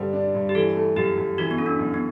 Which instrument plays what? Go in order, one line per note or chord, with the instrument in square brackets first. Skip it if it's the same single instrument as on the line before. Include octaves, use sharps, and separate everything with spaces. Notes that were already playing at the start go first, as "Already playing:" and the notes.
Already playing: [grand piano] G2 D3 G3 [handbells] B4
[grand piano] D4
G2
[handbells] G4
[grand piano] E3 [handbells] A4
[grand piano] A3
[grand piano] F#2 [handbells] G4
[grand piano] F#2
[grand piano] E3 [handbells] F#4
[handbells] B3
[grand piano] A3 [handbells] C#4
[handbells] D4
[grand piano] F#2
[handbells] B3